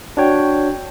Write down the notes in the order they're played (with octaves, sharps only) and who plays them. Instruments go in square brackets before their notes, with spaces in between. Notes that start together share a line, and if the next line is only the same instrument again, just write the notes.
[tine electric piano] D4 F#4 C#5 G5